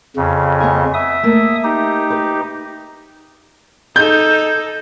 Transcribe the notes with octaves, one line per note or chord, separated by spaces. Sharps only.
F2 C#3
B3 D#5 G#5
E5 D#6
A3 A#3
D#4 G4
B4
D#4 A4 G6